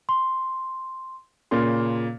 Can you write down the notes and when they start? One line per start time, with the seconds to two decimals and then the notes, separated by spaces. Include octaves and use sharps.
0.09 C6
1.51 A#2 C#3 A#3 C6